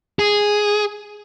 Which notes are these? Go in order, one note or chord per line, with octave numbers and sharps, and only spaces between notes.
G#4